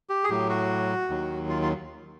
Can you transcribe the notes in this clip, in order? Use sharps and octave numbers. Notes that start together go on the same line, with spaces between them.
G4
G#4
A2 F#3 G4
F#4
D#2 D#3 F#3
F4
F4